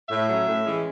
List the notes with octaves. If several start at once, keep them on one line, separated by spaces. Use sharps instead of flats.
A2 E5
F#3 A3 C#4
A2
E3 G#3 C#4